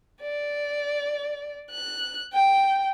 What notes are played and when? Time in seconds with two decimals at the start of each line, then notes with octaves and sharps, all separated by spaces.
0.22 D5
1.71 F#6
2.34 G5